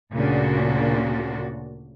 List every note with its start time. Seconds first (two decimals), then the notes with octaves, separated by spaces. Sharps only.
0.14 D2 A#2 C#3 D4 F#4